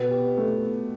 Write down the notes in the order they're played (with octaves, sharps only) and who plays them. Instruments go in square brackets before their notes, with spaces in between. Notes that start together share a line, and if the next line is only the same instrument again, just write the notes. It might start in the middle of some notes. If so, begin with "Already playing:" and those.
Already playing: [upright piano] B2 [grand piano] B3
[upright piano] G4
A3